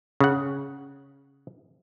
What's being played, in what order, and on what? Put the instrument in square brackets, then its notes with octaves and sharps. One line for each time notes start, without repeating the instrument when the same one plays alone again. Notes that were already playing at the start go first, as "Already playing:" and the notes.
[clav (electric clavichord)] C#3 F#5